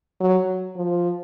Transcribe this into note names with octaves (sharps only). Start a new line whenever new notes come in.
F#3
F3